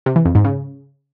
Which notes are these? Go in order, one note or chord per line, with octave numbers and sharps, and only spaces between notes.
C3
E3
F2
G#2
C#3